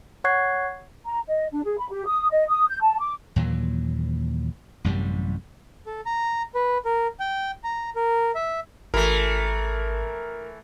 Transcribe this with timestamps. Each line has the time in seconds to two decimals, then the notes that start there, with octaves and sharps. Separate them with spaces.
0.24 C#5 F#5 C#6 F#6 G#6 C7
1.06 A#5
1.28 D#5
1.52 D4
1.64 G#4
1.78 B5
1.91 G4
2.07 D#6
2.31 D#5
2.49 D#6
2.69 G6
2.81 A5
3.00 D6
3.36 D#2 A#2 E3 F#3
4.84 A1 F#2 C3 G3
5.86 A4
6.06 A#5
6.55 B4
6.85 A#4
7.20 G5
7.64 A#5
7.96 A#4
8.35 E5
8.94 G#1 E3 A3 A#4